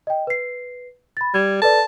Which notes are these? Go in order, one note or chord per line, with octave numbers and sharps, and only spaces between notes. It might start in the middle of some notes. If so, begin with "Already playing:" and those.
D#5 G5
B4 C7
B5 A6
G3 G#6
A4 B4 D5 A5